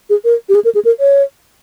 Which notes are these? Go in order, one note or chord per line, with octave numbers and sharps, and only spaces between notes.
G#4
A#4
G4
G#4
A#4
G#4
A#4
C#5